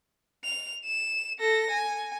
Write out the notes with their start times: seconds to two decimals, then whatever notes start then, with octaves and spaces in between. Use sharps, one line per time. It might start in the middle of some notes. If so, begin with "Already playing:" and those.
0.44 F7
0.85 E7
1.40 A4 A#6
1.70 G#5